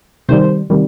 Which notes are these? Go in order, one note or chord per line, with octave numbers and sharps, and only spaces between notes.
C3 D#3 G3 C5
C3 D#3 G3